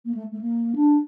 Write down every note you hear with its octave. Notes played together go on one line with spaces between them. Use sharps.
A#3
A3
A3
A#3
D4